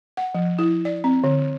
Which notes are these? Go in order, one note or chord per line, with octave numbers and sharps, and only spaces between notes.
F#5
F3
E4
D5
C4
D3